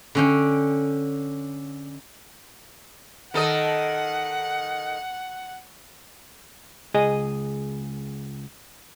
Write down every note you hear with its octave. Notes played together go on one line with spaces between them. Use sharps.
D3 C#4 G5
D#3 A4 D#5 F#5
C#2 G#4 D#5